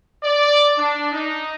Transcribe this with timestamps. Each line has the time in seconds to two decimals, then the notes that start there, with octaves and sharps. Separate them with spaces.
0.24 D5
0.77 D4
1.12 D#4